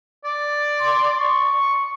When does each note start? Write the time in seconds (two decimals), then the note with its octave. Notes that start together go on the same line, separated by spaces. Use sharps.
0.24 D5
0.80 C6
1.20 C#6